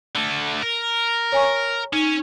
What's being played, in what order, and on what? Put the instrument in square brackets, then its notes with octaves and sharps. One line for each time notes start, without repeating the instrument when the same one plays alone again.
[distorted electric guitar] D3 A3
A#4
[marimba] C#5 G#5 C#6
[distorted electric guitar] C#4 [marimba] D#4